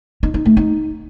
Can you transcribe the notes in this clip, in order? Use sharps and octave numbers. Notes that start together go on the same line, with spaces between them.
D#4
D#4
A3
D#4